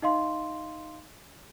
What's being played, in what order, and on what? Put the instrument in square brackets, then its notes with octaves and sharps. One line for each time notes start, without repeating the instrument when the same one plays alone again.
[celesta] D#4 D#5 F5 C6